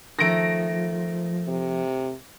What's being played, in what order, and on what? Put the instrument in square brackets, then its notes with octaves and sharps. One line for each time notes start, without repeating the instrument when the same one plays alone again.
[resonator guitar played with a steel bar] D#3 A3 [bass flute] F3 [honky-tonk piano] A#6 D7
[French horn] C3